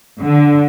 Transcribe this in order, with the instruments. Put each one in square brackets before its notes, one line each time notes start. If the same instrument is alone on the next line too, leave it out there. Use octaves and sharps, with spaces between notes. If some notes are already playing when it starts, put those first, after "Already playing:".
[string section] D3